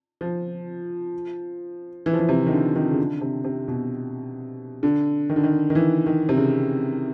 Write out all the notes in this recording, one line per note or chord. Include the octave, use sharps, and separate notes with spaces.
F3
E3
F3
E3
C3
D#3
D3
D#3
C#3
D3
C3
C3
B2
D3
D#3
D3
D#3
D#3
E3
D#3
C3
C#3